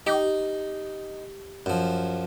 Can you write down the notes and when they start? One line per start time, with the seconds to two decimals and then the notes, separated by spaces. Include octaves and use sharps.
0.07 D#4 G4
1.66 F#2 F3